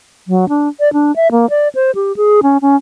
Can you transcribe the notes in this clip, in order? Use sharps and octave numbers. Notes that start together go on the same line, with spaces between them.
F#3
D4
D5
D4
E5
A#3
D5
C5
G4
G#4
C#4
C#4